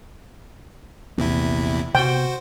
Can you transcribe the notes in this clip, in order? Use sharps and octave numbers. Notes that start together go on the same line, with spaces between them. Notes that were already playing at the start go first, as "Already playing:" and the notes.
A#1 E2 C3 A#3 B3 E4
C3 B3 F#4 C5 G5